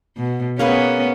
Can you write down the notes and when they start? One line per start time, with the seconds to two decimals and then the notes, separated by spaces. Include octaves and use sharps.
0.17 B2
0.59 A#3 B3 C#4 G#4 B4